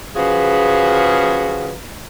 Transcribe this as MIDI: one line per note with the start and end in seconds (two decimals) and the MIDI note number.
0.15 1.72 49
0.15 1.72 53
0.15 1.72 66
0.15 1.72 68
0.15 1.72 71